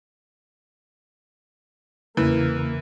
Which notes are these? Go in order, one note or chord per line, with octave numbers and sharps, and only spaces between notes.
E2 C#3 E3 A#3